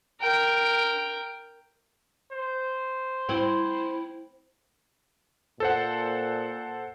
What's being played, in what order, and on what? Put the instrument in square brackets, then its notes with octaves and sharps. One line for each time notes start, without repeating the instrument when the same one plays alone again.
[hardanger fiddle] A#4 G5
[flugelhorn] C5
[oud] C4 [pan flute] E4
[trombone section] A#2 [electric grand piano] A4 C5 F#5